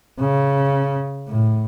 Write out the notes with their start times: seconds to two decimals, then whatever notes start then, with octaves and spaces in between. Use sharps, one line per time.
0.20 C#3
1.28 A2